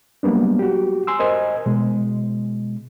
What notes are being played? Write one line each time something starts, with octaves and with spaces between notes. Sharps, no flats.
F#3 G3 A#3 B3 D4
F#4 G4
G#5 C6 E6
A#4 C5 D#5 G#5
B2 G#3